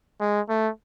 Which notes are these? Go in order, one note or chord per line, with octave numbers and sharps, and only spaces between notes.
G#3
A3